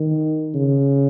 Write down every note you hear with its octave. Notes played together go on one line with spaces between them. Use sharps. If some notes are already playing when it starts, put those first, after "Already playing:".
Already playing: D#3
C#3